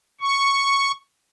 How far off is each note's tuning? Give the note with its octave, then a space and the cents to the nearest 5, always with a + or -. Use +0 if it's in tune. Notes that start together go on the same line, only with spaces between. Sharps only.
C#6 +0